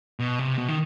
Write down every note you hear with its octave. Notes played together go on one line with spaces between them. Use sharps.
B2
C3
B2
D#3